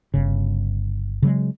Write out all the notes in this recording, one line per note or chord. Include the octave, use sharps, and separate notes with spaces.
G1 C#3
C#3 F#3 G#3